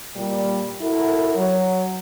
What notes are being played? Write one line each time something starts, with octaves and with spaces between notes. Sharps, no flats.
A#2 G3
E4 F#4 A4 A#4
F#3